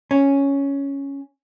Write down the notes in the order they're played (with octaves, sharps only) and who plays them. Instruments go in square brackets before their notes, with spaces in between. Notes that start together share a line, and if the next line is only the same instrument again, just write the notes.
[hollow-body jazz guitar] C#4